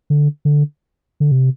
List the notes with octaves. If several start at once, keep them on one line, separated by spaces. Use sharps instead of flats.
D3
D3
D3
C3